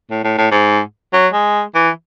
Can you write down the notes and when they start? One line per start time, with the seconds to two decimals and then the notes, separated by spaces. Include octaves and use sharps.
0.11 A2
0.24 A2
0.38 A2
0.51 G#2
1.13 F#3
1.33 G#3
1.75 E3